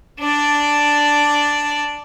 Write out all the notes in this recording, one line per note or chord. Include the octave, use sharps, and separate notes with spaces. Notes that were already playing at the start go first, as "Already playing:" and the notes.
D4 D5